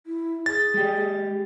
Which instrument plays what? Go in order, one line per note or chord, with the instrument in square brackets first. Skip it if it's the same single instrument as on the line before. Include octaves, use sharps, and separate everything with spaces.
[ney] E4
[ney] G#4 [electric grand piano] A6
[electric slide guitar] G#3 G4